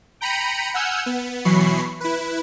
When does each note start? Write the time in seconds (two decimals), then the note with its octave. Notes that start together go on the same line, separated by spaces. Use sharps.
0.21 G5 A#5 B5 C#7 D#7
0.74 F#5 G#5 E6 F6 G6
1.06 B3
1.45 B2 E3 F#3 B5 C#6 C7
2.00 E4 B4